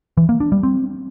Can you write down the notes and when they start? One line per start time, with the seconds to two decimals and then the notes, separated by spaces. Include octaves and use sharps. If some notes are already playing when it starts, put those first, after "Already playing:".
0.17 E3
0.29 A#3
0.40 D4
0.52 G3
0.63 C4